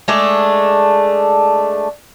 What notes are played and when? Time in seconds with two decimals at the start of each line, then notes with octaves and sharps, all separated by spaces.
0.08 G#3 A3 D4